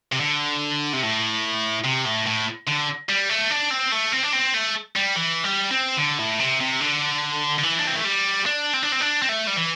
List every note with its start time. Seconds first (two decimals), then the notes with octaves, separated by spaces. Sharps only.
0.12 C3
0.20 D3
0.93 C3
1.03 A2
1.85 C3
2.06 A2
2.27 A2
2.68 D3
3.09 G3
3.30 A3
3.51 D4
3.71 C4
3.92 A3
4.12 C4
4.24 D4
4.33 C4
4.54 A3
4.96 G3
5.16 E3
5.44 G3
5.71 C4
5.98 D3
6.19 A2
6.40 C3
6.61 C3
6.81 D3
7.58 D3
7.63 E3
7.79 D4
7.87 C4
7.96 A3
8.05 G3
8.46 D4
8.74 C4
8.83 D4
8.92 C4
9.01 D4
9.22 C4
9.29 A3
9.47 G3
9.56 E3